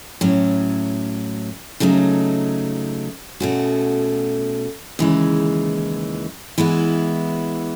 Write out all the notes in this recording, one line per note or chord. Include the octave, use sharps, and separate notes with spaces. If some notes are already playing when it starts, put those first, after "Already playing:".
A2 F#3 C#4
C#3 F#3 A3 D#4
B2 A3 C#4 F#4
D#2 C#3 E3 G#3
E3 G#3 B3 E4